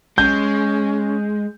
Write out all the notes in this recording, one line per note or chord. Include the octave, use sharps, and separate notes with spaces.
G#3 C#4 G6